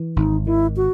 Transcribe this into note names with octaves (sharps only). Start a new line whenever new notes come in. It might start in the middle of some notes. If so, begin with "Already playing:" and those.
Already playing: E3
G#1 D#4
D#3 E4
F#4